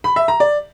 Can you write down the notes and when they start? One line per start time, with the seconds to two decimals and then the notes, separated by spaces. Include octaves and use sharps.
0.04 B5
0.16 E5
0.28 A#5
0.40 D5